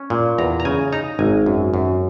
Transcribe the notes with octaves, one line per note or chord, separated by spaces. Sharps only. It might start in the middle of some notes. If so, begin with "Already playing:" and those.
Already playing: C#4
A#2
E2 A#5
A#5
C#3 G#5
D#4 A#5
G#1 G#5
F#2
F#2